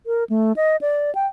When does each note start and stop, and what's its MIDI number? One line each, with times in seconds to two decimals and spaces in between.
0.07 0.24 70
0.30 0.53 57
0.56 0.76 75
0.81 1.13 74
1.15 1.26 79